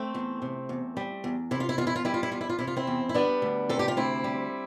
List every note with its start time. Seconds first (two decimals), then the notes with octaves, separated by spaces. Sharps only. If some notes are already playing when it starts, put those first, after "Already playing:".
Already playing: A3 C4
0.14 E2
0.42 C3
0.69 E2
0.97 G3
1.24 E2
1.51 C3 E4
1.60 F4
1.69 E4
1.78 E2 F4
1.87 E4
1.96 F4
2.05 G3 E4
2.14 F4
2.23 E4
2.32 E2 F4
2.41 E4
2.49 F4
2.59 C3 E4
2.67 F4
2.76 C4 E4
2.87 E2
3.09 E4
3.14 G3 B3 D4
3.42 D2
3.69 C3 A4
3.79 G4
3.88 F4
3.97 D2 C4 E4
4.24 G3